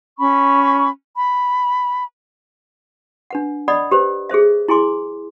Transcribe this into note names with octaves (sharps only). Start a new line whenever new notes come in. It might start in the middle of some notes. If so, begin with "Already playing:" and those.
C#4 B5 C#6
B5
D4 B4 F#5
D5 D#5 F#5 B5 D#6
G4 B4 C5
G#4 A4 C5 E5
E4 G#4 G#5 C6 D6